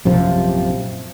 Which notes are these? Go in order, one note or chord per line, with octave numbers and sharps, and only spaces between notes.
A#1 F#2 C3 F3